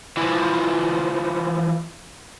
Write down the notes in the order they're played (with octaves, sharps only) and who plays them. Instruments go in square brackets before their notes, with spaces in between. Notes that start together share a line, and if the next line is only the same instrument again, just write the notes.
[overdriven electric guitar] E3 F3